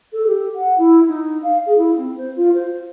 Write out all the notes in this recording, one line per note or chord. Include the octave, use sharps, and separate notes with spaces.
A4
G4
F#5
E4
D#4
F5
G#4
E4
C4
C5
F4
C5